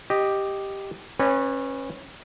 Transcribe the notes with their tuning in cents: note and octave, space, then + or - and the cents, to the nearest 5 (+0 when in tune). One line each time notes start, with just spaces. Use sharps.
G4 +0 D#5 -5
C#4 -25 B4 +0 D5 +30